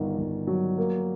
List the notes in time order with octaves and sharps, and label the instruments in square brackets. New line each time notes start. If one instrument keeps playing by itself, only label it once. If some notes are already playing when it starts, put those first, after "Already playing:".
Already playing: [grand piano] G1 D#3
G1
F#3
A#3